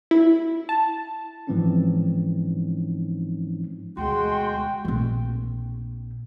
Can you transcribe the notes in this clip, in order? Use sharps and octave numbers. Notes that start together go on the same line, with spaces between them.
E4
A5
G#2 E3 F3 C4 C#4 D#4
D2 B2 G#3 F#4 G5 C6
A#1 C4